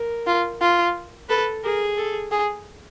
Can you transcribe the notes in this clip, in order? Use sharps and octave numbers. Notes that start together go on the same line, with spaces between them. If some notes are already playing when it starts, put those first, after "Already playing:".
Already playing: A#4
F4
F4
A4 B4
G#4 A#4
A4
G#4